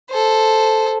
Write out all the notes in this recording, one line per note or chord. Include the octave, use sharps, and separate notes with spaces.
A4 C5